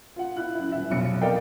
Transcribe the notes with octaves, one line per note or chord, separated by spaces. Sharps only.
F4 F#5
E4 F#6
F#2 E4
D#1 E5
F1 B1 C#7
A4 A#4 D5 D#5 F5 G5